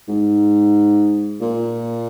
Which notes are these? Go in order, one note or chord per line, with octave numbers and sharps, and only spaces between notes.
G#2
A#2